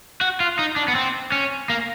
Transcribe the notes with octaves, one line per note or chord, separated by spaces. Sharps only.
F#4
F4
D#4
D4
B3
C4
C#4
A#3